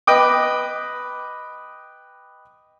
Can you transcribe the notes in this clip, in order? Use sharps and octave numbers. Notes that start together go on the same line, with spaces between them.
B4 D#5 G5 D6